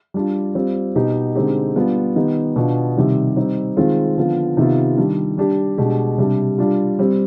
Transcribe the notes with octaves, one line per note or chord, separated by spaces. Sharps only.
G3 D4 F4
G3 C4 F4
B2 B3 D#4 G4
D3 G#3 C4 D#4 G4
G3 B3 D4 F4
D#3 B3 D#4 G4
B2 B3 D4 F4
C3 D#3 G3
G3 C4 D#4 G4
D#3 G#3 C4 F4
D3 F3 B3 F4
C3 D#3 B3 F4
D#3 G3 D4
G3 D4 G4
B2 G#3 D4 G4
C3 G3 D4 G4
G3 D4 F4
G3 C4 G4